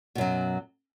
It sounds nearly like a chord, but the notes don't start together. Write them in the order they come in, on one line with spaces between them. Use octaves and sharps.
B2 F#2 F#3